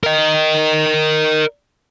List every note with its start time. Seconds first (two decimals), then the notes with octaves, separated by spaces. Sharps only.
0.04 A#4 D#5